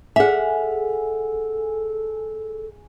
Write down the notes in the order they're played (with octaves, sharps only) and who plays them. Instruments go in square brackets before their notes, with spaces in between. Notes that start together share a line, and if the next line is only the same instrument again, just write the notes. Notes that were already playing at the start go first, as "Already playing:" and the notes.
[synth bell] G#4 G#5 [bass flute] A4 [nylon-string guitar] E5 F#5